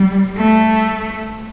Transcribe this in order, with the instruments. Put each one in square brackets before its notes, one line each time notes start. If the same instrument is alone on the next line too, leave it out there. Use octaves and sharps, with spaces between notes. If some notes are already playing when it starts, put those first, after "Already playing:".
Already playing: [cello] G3
A3